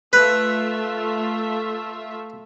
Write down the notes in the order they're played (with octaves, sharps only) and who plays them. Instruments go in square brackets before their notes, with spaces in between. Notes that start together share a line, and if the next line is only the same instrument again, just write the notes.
[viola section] A3 F4 E5 [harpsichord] B4